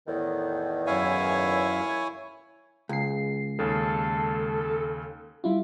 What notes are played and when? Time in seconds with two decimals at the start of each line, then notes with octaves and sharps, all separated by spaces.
0.07 E2 A2 D#3
0.87 F#2 E4 C#5 E5 F5 G#5
2.89 C#2 G#4 C7
3.59 D#2 C#3 A4
5.44 G3 E4 F4